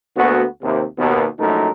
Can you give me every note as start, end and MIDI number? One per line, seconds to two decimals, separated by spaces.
0.17 0.45 38
0.17 0.45 58
0.17 0.45 59
0.17 0.45 66
0.63 0.84 39
0.63 0.84 48
0.98 1.25 39
0.98 1.25 47
1.39 1.69 34
1.39 1.69 42
1.39 1.69 57
1.39 1.69 63
1.39 1.69 70